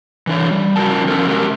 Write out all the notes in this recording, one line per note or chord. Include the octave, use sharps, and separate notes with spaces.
E3 D4 C#5
G3
C#3 F3 E4 F#4 A#4 A5
D3 F3 C#4 D#4 A4 A#4
G#3 G4 A#4